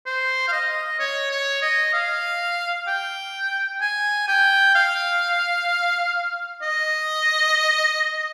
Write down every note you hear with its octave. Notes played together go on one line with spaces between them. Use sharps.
C5
F5
D#5
C#5
C#5
D#5
F5
G5
G#5
G5
F5
D#5